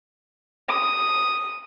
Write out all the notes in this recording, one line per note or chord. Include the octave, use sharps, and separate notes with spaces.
D#6